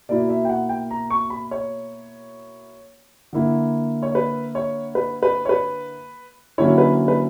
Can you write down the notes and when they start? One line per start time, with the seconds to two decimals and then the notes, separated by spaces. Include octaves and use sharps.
0.09 B2 A#3 E4 D5
0.29 E5
0.45 G5
0.49 F#5
0.69 G5
0.91 A#5
1.10 C#6
1.30 B5
1.51 C#5
3.33 D3 A#3 E4
4.03 C#5
4.15 B4
4.55 C#5
4.95 B4
5.23 B4
5.45 C#5
5.49 B4
6.58 D3 F#3 A#3 C#4 E4 C#5
6.78 B4
7.08 B4